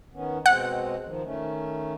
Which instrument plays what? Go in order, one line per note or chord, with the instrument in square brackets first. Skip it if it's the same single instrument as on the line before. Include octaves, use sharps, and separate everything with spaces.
[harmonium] D#3 B3 C#4
[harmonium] B2 G#3 C4 [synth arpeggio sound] F#5
[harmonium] D#3 F3
D#3 A3 C#4